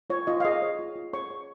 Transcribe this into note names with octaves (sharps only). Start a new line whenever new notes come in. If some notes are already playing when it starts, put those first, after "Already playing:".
F4 C#5
F4 D#5
F5
G#4 D#5
C#5
F4
F4
G#4 C#5 C#6
C#5